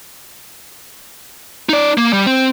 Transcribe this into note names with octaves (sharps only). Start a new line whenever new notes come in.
D#4 D5
A#3
G3
C4